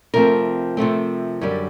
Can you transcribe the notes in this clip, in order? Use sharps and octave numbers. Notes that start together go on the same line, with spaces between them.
C3 F3 A3 C4 A#4
C3 F3 A3 C4
F#2 D3 G3